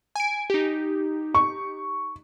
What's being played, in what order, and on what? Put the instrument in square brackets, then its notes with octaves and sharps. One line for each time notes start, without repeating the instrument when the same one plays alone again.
[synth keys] G#5 D7
D#4 G4
[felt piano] C#6